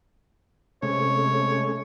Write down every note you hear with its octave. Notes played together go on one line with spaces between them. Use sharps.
C3 G#3 A3 C#4 C#5